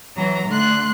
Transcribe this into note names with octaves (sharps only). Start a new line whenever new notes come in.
E3 F#3 A#5
D3 A3 C6 F#6